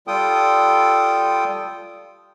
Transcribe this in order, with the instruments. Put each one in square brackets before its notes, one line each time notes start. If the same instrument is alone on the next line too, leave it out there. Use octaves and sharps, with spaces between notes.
[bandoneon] G3 F4 A4 G5 D#6